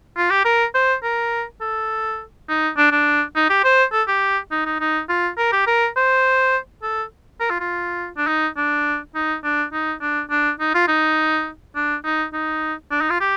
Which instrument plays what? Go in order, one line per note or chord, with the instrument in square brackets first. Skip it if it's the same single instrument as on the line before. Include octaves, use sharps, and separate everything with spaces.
[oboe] F4
G4
A#4
C5
A#4
A4
D#4
D4
D4
D#4
G4
C5
A4
G4
D#4
D#4
D#4
F4
A#4
G4
A#4
C5
A4
A#4
F4
F4
D4
D#4
D4
D#4
D4
D#4
D4
D4
D#4
F4
D#4
D4
D#4
D#4
D4
D#4
F4
G4